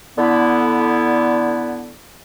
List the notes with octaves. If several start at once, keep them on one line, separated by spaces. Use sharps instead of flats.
D3 B3 E4